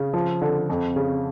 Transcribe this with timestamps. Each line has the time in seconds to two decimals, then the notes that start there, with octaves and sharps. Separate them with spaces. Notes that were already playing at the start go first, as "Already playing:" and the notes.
Already playing: C#3
0.13 F3
0.42 D3
0.69 F2
0.96 C#3